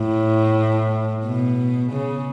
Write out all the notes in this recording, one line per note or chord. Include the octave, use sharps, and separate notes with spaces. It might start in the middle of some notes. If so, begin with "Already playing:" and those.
Already playing: A2
B2
C#3